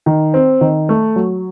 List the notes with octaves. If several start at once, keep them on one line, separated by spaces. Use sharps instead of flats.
D#3
C4
D#3
A3
F#3